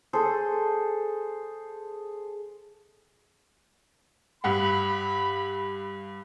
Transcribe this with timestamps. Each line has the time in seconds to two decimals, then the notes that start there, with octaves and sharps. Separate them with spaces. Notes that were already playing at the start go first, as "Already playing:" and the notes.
0.13 G#4 A4 C5
4.44 G2 F#5 B5